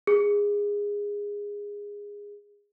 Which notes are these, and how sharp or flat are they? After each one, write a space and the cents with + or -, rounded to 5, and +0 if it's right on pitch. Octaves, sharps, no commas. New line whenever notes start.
G#4 -20